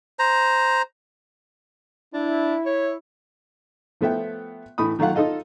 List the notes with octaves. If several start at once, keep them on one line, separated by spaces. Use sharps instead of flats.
C5 A#5
D4 E4
C#5
F3 A3 B3 E5 G5
A2 E3 A3 B5 D#6
D#3 F#3 A3 F4 F5 F#5
D#4 F4 A4 D#5 F5